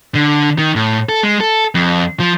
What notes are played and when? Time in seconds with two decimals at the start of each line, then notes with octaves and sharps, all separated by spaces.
0.15 D3
0.58 D#3
0.76 A2
1.09 A4
1.23 G#3
1.40 A4
1.75 F2
2.20 F3